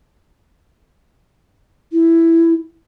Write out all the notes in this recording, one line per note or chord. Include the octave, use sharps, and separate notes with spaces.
E4